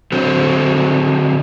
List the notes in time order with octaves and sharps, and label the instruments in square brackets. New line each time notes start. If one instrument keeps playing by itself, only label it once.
[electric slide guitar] D3 F#3 C4